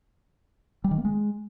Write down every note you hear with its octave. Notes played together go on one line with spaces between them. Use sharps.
G3
D#3
A#3
G#3